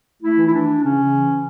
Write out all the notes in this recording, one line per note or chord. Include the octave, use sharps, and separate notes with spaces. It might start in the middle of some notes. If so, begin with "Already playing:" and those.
A3 E4
E3
E4
E3 D4
E3
C#3 C#4
C#3
E3
C#3